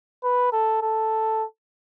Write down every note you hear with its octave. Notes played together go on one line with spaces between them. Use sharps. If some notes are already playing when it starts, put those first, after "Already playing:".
B4
A4
A4